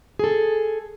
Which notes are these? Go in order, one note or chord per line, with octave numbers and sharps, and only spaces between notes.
G#4 A4